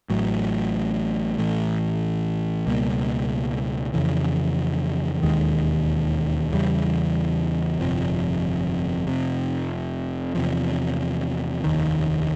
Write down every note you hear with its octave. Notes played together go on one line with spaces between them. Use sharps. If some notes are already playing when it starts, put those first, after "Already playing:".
A1 A2 F#3
A1 A2 E3 A3
C#2 B2 G3 A#3
F2 C#3 E3
E1 D#2 D#3 G#3
E2 C#3 E3 G3
G1 F2 C3 F3
F1 F2 C3
E2 C3 F3
F1 D#2 D#3